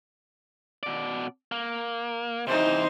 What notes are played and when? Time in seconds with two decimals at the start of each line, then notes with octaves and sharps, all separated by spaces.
0.83 B2 D5
1.52 A#3
2.47 C3 E3 D#4 C5